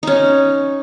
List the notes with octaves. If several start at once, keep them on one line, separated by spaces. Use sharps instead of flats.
C#4 D#4